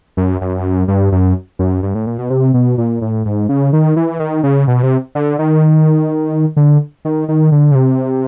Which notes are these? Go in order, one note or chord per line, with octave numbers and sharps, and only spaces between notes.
F#2
F#2
G2
F#2
F#2
G2
A2
A#2
B2
C3
B2
A#2
A2
G#2
C#3
D#3
E3
D#3
C#3
B2
C3
D3
D#3
D3
D#3
D#3
D3
C#3
C3